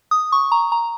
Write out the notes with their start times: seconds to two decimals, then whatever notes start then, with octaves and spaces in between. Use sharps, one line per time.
0.11 D#6
0.32 C#6
0.52 A#5
0.72 A#5